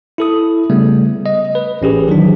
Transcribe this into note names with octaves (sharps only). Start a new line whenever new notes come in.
E4 A4 D#6
C#3 G3 A3 B3
D#5
B4
A1 C#4 G4 G#4
D#3 E3 F#3 D4